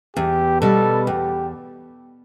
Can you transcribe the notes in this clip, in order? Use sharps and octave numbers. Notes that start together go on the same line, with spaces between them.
E2 G4
B2 G3 A4
E2 G4